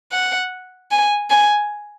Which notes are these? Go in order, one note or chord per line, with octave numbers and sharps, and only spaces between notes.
F#5
G#5
G#5